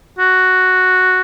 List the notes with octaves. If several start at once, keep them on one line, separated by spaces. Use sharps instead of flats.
F#4